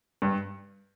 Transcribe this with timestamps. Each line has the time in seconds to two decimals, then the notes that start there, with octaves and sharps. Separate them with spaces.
0.22 G2